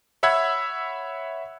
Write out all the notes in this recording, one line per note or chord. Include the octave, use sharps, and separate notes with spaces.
C#5 E5 F#5 B5 E6 G#6